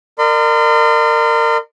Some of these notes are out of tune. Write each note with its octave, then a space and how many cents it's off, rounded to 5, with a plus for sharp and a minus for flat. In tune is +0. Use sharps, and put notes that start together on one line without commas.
A#4 -20 D5 +45 C6 -40